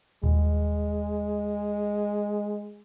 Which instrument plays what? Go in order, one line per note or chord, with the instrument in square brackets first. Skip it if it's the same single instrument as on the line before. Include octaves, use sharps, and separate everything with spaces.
[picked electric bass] D#1 [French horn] G#3